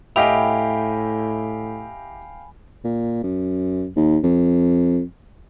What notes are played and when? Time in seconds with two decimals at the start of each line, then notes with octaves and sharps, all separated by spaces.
0.16 A2 E4 G4 D#5 F5 G5 G#5 B5
2.84 A#2
3.23 F#2
3.96 D#2
4.24 F2